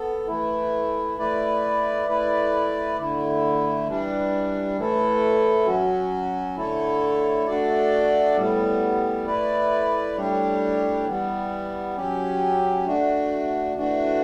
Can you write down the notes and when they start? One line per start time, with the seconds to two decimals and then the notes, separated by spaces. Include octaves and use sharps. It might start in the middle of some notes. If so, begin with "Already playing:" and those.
Already playing: B3 A4
0.27 E3 A3 E4
1.18 A3 E4 B4 D5
2.07 A3 E4 B4 D5
2.98 D3 A3 E4
3.87 E3 G3 D4
4.76 A2 E3 A3 E4 A4
5.66 F#3 C#4 F#4
6.57 D3 A3 E4 A4 C#5
7.46 A3 D4 F#4 A4 D5
8.36 A2 G3 B3
9.26 A3 E4 B4 D5
10.16 A2 G3 D4 G4 C#5
11.06 E3 G3 B3
11.97 F#3 C#4 G4
12.86 A3 D4 F#4
13.76 E3 A3 D4 F#4